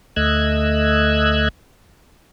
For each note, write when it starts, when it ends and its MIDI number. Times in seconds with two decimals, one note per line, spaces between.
0.16 1.48 38
0.16 1.48 57
0.16 1.48 75
0.16 1.48 88
0.16 1.48 90
0.16 1.48 92